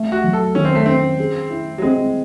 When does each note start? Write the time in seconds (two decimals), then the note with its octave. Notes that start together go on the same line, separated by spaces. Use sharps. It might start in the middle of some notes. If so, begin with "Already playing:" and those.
Already playing: A3
0.12 F#4
0.24 F#3
0.33 A4
0.55 D#3 C#4
0.65 C4
0.75 A3
0.86 C4 C#4
1.19 G#4
1.50 E4
1.78 F#3
1.82 G#3 C4